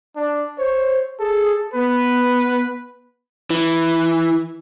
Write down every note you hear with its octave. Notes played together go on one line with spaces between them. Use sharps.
D4
C5 C#5
G#4 A4
B3 B4
E3